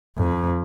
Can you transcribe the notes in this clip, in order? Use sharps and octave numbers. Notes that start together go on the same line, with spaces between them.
F2